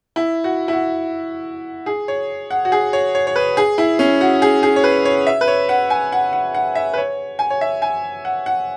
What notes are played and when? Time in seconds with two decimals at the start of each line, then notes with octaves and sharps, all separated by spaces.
0.16 E4
0.44 F#4
0.68 E4
0.73 F#4
1.86 G#4
2.08 C#5
2.50 F#5
2.65 F#4
2.72 G#4
2.93 C#5
3.15 C#5
3.27 C#5
3.36 B4
3.57 G#4
3.78 E4
3.99 C#4
4.21 F#4
4.42 G#4
4.63 G#4
4.76 C#5
4.84 B4
5.05 C#5
5.27 E5
5.41 B4
5.48 C#5
5.69 F#5
5.90 G#5
6.12 F#5
6.33 F#5
6.55 F#5
6.75 E5
6.93 B4
6.98 C#5
7.39 G#5
7.50 C#5
7.61 E5
7.82 G#5
8.25 F#5
8.46 F#5